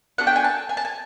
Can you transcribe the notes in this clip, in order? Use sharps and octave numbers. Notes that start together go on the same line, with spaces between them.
B3 D4 F#4 A4 F#5
G5
G#5
A5
G#5
A5
G#5